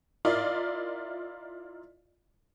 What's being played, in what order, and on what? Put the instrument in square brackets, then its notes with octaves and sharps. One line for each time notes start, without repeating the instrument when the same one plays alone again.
[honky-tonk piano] E4 F4 A#4 D5 D#5 F5